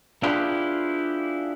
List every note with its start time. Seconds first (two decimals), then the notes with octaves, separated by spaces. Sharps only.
0.23 D4 E4 F4 G4 G#4 B4